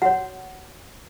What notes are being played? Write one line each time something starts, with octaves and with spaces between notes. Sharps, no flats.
F#4 C#5 F#5